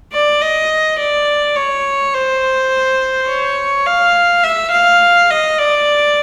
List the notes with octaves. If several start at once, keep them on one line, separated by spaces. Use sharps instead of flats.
D5
D#5
D5
C#5
C5
C#5
F5
E5
F5
D#5
D5